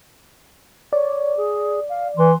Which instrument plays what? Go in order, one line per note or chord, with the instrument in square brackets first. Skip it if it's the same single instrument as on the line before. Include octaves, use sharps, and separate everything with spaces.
[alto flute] C#5 [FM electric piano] D5
[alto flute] G#4
F5
[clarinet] E3 [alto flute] C6